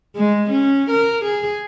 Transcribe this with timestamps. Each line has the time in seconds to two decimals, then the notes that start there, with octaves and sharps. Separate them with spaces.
0.16 G#3
0.50 C#4
0.90 A#4
1.25 G#4